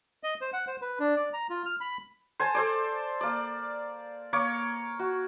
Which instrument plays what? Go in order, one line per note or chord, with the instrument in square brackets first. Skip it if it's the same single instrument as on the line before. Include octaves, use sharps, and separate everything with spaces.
[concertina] D#5
C5
F#5
C5
B4
D4
D5
A#5
F4
F6
B5
[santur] C5 G#5 A5
A4 C5 D5
A#3 D5
A#3 C#5 C#6 D6
F#4